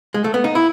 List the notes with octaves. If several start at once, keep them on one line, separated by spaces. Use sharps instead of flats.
G#3
A3
B3
D#4
E4